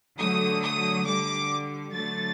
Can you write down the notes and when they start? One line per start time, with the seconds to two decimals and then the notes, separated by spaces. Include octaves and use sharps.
0.19 D3 F#3 A3 D#6
0.63 D#6
1.07 D3 G3 D6
1.93 D3 F#3 A3 A6